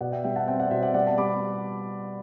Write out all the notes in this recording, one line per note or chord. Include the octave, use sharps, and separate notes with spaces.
B2 D5 F#5
E5 G5
G3 E5 G5
F#5 A5
C4 E5 G5
D5 F#5
B2 C5 E5
D5 F#5
G3 D5 F#5
F#5 A5
G3 B5 D6